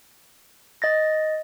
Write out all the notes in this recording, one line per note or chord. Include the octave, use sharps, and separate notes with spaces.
D#5 A6 A#6